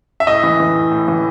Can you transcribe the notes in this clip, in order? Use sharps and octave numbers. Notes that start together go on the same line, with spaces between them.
E5
A2 D#5
E3
E3
A2
A2
E3